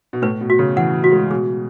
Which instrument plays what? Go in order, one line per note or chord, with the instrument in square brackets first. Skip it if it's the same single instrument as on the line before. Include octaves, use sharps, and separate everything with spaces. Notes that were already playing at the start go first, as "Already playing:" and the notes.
[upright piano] B2
[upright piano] A2 [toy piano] B4
[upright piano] B2
[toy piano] F#4
[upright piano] C#3
[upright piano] E3 [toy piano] F#5
[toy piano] F#4
[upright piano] G#3
[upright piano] B2 [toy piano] G#4